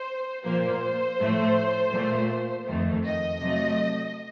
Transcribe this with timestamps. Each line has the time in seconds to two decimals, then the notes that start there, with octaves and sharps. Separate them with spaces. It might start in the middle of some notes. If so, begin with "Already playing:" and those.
Already playing: C5
0.44 A#2 F3 A#3 C5
1.19 A2 F3 A3
1.93 A#2 A3
2.67 F2 D#3 A3
3.04 D#5
3.41 C3 F#3 A3